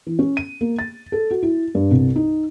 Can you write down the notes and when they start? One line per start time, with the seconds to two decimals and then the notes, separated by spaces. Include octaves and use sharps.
0.07 E3
0.19 C#4
0.37 D#7
0.61 A#3
0.79 A6
1.12 A4
1.31 F#4
1.43 E4
1.75 G2
1.91 C2
2.16 D#4